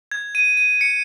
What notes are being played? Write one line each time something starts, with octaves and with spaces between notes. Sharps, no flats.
G#6
D#7
D#7
C#7